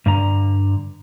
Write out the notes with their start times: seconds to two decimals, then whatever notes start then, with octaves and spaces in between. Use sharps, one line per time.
0.06 G2 D3 A#5